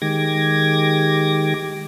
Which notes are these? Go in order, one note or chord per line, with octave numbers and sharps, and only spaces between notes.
D#3 G#3 G4 D6 G#6 A#6